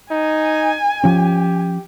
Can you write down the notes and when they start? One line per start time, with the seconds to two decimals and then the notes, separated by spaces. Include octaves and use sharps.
0.11 D#4 G#5
1.04 F3 C#4 G4